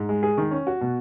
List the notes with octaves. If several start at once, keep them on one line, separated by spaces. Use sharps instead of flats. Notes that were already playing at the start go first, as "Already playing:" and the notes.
Already playing: G#2
G#3
G#4
D#3
C#4
F#4
B2